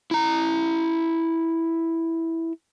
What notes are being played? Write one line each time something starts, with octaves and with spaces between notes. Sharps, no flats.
E4 A#5